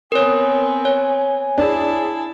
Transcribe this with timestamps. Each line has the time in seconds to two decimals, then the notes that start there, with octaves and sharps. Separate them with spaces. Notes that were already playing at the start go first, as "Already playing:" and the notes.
0.12 B3 C4 A#4 C#5 G#5
0.85 C#5
1.58 D4 E4 G#4 A5